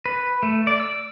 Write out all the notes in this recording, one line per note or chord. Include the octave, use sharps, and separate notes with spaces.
B4
A3
D5
E6